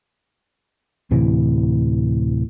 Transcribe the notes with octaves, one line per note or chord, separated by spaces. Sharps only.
D2 A2 C3 E3